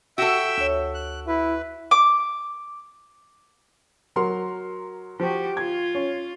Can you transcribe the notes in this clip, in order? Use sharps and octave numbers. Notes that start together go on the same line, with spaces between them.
F#4 A4 E5 G5 E6
D2 C#5
F#6
E4 B4
D6
F#3 A#4 C6
F3 F#4 G4
F4 G#6
C#4